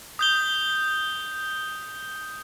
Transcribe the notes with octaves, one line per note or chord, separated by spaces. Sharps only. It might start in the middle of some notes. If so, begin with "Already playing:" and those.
D#6 G6 G7